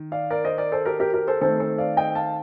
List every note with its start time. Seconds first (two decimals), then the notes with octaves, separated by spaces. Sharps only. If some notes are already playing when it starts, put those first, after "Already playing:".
Already playing: D#3
0.12 D5 F5
0.30 A#4 D5
0.45 C5 D#5
0.58 A#4 D5
0.72 A4 C5
0.86 G4 A#4
1.00 G4 A#4
1.14 G4 A#4
1.27 A4 C5
1.41 D#3 A3 C4 A4 C5
1.60 A4 C5
1.78 D5 F5
1.97 D#5 G5
2.15 F5 A5